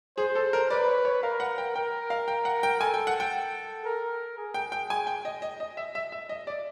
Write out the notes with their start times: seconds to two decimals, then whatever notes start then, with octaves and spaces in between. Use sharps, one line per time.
0.18 G#4 C5
0.35 A4
0.53 A#4
0.70 B4 D5
0.88 C#5
1.05 C#5
1.23 A#4 F5
1.40 F#5
1.58 G5
1.76 A#4 G5
2.10 F5
2.28 G5
2.45 F#5
2.63 G5
2.80 A4 G#5
2.94 G5
3.07 F#5
3.20 G5
3.85 A#4
4.38 G#4
4.54 G5
4.72 G5
4.90 G#5
5.07 G5
5.25 D#5
5.42 D#5
5.60 D#5
5.77 E5
5.95 E5
6.12 E5
6.29 D#5
6.47 D5